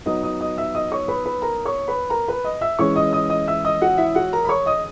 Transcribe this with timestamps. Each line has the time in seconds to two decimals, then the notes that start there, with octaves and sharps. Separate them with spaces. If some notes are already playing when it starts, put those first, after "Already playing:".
0.06 F#3 B3 D#4 D#5 D#6
0.23 D#5 D#6
0.41 D#5 D#6
0.57 E5 E6
0.75 D#5 D#6
0.91 C#5 C#6
1.08 B4 B5
1.25 B4 B5
1.42 A#4 A#5
1.65 C#5 C#6
1.88 B4 B5
2.10 A#4 A#5
2.28 B4 B5
2.44 D#5 D#6
2.61 E5 E6
2.79 E3 G#3 C#4 E4 C#5 C#6
2.96 D#5 D#6
3.13 D#5 D#6
3.29 D#5 D#6
3.48 E5 E6
3.65 D#5 D#6
3.82 F#4 F#5
3.98 E4 E5
4.15 F#4 F#5
4.33 A#4 A#5
4.45 B5
4.49 C#5 C#6
4.66 D#5 D#6